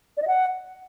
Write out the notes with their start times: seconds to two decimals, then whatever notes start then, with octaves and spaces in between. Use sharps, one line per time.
0.17 D5
0.22 D#5
0.27 F#5